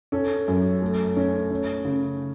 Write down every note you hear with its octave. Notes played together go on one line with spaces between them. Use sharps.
C#4 A4
F#2
A3
C#4
C#4
C#3